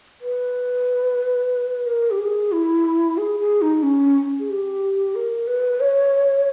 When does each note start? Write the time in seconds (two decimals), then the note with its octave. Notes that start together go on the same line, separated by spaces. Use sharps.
0.21 B4
1.86 A#4
2.11 G4
2.18 G#4
2.52 E4
3.17 G#4
3.40 G#4
3.62 D#4
3.83 C#4
4.40 G#4
4.50 G4
5.15 A#4
5.47 B4
5.80 C#5